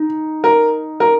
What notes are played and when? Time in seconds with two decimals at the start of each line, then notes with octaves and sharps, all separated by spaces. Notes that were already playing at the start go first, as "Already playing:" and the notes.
Already playing: D#4
0.44 A#4
1.00 A#4